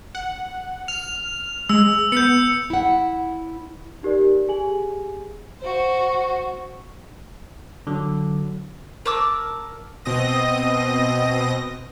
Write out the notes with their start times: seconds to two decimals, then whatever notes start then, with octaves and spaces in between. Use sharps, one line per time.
0.15 F#5
0.88 F6 F7
1.69 G#3 E6
2.12 B3 G6 C#7
2.70 E4 F#5
4.03 D#4 G4 A#4 D5
4.48 G4 G#4 G#5 F#7
5.59 F#4 C5
7.87 D3 F#3
9.05 A#4 A5 D6 E6
10.05 B2 C4 D#5 D#6 A#6